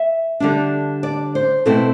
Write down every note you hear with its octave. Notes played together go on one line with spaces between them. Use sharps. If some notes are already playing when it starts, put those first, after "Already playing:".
Already playing: E5
D3 G3 D4
D5
C5
B2 A3 C4 E4 A4